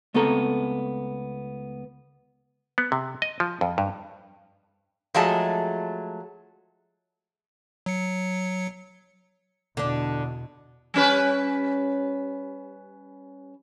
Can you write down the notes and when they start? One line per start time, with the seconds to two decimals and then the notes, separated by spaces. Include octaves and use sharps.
0.14 C#2 A3 B3 C4 A4 A#5
2.78 B3
2.92 C3
3.22 D#5
3.40 F3
3.61 F2
3.78 G2
5.14 F3 F#3 G#3 A3 A5
7.86 F#3 C#7
9.77 E2 B2 D3 D4
10.94 G3 C#4 B4